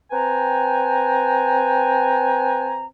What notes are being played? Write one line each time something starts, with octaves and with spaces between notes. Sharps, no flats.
C4 B4 G5 G#5 A#5